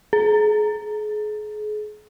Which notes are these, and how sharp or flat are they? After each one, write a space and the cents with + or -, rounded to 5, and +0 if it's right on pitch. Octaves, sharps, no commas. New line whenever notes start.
G#4 +35